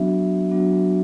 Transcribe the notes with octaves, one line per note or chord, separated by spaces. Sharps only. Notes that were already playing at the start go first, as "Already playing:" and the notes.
Already playing: F#3 B3 D4 F#4 E5
F#3 B3 D4 F#4